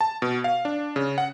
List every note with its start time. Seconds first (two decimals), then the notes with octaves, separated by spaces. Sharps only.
0.01 A5
0.22 B2
0.44 F5
0.65 D4
0.96 C#3
1.18 F#5